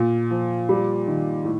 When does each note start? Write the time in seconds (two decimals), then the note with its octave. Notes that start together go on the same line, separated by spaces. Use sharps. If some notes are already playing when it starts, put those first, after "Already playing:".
Already playing: A#2
0.31 F3
0.69 G3
1.07 D#3
1.45 A2